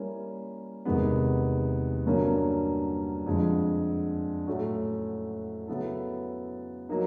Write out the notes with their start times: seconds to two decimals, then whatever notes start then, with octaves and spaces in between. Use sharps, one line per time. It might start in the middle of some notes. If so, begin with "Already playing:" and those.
Already playing: G3 A#3 C#4 E4
0.85 E2 C3 D#3 G#3 B3
2.06 G2 D3 F#3 A#3 C#4
3.26 F2 D3 F3 G#3
4.47 A2 F#3 A3 C#4 F#4
5.68 C#3 F#3 B3 E4 A4
6.89 F#3 A#3 D#4